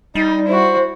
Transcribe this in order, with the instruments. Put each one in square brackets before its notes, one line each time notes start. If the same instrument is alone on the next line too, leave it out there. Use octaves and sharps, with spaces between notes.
[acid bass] G3 [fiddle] D#4
[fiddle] E4 F#4 [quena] C5